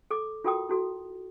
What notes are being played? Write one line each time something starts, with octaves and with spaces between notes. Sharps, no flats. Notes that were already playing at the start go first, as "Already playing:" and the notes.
A4 D6
F4 F#4 A4 A#4 G5 D#6
E4 F#4 A4